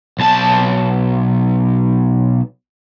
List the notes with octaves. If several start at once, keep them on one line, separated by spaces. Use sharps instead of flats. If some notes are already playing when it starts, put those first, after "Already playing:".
B1 A5